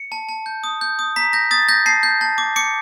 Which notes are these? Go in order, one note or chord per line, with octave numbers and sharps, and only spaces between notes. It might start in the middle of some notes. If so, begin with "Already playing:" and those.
Already playing: C#7
A5
A5
G6
D#6
G6
D#6
A#5 B6
G6 A#6
D#6 A6
G6 A#6
A5 C7
G6
A5
D6
D6 C#7